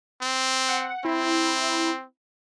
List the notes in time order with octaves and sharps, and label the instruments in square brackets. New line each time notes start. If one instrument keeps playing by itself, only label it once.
[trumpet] C4
[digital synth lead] F#5
[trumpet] C4 [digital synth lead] E4